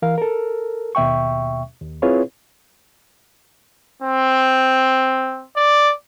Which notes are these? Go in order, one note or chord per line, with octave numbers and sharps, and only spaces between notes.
E3 A#4 F5
A4 A#4
D#2 B2 E5 G5 C#6
D#2
C4 E4 F4 G#4 B4 C#5
C4
D5